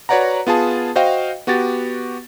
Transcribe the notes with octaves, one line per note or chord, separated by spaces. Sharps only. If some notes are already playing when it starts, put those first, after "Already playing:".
F#4 B4 C#5 D5 F#5 A#5
B3 F4 G#4 A5
F#4 C5 D#5 F5 G5
B3 F#4 G4 A6